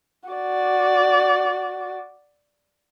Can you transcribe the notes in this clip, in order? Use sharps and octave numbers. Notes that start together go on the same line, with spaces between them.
F#4 D5